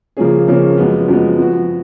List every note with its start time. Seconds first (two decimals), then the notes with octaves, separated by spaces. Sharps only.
0.17 C#3 F3 A#3 C#4 G#4
0.48 C#3 F3 A#3 C#4 G#4
0.77 F#2 F3 G#3 B3
1.08 F#2 F3 G#3 B3
1.38 F3 B3 F#4